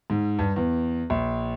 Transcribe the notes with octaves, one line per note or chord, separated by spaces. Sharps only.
G#2
G2
E2
A#1